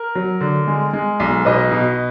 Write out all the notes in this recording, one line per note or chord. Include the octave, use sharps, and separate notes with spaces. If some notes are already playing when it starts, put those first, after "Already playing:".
Already playing: A#4
F#3
D3
G#3
G#3
B1
B2 B4 D#5
B2